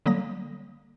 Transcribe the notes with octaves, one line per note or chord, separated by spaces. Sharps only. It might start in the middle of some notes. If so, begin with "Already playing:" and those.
D3 F#3 G3 A#3 D#6 A#6